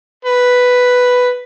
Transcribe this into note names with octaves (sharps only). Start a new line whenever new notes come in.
B4